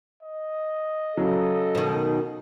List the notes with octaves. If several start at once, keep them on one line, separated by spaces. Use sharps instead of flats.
D#5
C#3 F#3 A4
B2 D#3